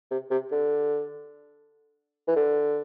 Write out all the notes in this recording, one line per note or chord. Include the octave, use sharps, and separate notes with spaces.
C3
C3
D3
E3
D3